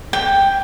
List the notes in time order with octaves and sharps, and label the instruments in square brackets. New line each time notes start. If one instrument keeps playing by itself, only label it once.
[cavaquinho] G5